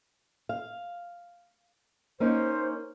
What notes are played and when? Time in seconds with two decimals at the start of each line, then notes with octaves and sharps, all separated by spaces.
0.49 F5
2.20 A#3 C#4 D#4 C5